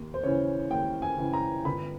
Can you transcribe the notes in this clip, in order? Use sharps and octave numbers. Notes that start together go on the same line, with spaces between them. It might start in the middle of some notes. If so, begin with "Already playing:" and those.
Already playing: D#2
C5
C#3 E3 C#5
D#2 G5
G#5
C#3 E3
A#5
G1 B5